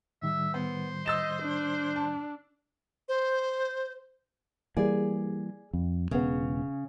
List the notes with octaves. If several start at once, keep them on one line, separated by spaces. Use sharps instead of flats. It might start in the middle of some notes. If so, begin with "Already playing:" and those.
A2 D#3 G3 E5
B3 C5
D#5 E6 A6 E7
D4
A5
C5
E3 G3 A#3 G#4 D5
F2
E1 C#3 B3